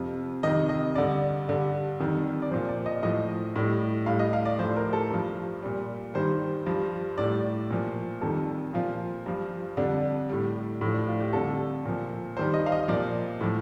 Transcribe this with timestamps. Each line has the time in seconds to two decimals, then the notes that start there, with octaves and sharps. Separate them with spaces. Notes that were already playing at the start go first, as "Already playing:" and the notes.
Already playing: F2 C3 F3
0.43 F2 C3 D#3 D#5
0.69 D#5
0.95 G2 D3 G3 D5
1.48 G2 D3 G3
2.00 F2 D#3 G3
2.42 D5
2.51 A#2 F3 C5
2.69 D5
2.86 D#5
3.03 A2 F3 D#5
3.56 A2 G3
4.06 A2 G3 F5
4.19 D#5
4.33 F5
4.45 D5
4.59 A2 F3 C5
4.76 A#4
4.93 A4
5.11 G2 F3
5.62 A#2 G3
6.14 G2 D#3 G3 C5
6.66 G2 F3
7.18 A2 G3 D5
7.71 A#2 F3
8.21 F2 D#3 G3 A4
8.73 A#2 F3 F4
9.26 G2 F3
9.77 F2 D3 G3 D4
10.29 A2 G3
10.81 A2 F3
10.94 D4
11.08 F4
11.20 G4
11.33 F2 D3 G3 A4
11.86 A#2 F3
12.37 G2 D#3 G3 C5
12.54 D#5
12.66 F5
12.72 D#5
12.88 A#2 F3 D5
13.41 A2 F3